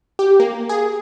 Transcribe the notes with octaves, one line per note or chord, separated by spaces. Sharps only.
G4
A#3
G#4